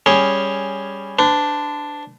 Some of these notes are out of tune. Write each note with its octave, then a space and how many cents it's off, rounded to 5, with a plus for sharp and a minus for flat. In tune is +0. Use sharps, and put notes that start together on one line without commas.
G3 +10 C#4 +0 G#4 +0
D4 +0 C5 -45